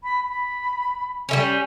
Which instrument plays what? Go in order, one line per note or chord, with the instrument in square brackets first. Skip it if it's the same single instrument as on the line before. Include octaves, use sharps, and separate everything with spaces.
[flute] B5
B5
[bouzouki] G3 G#3 C#4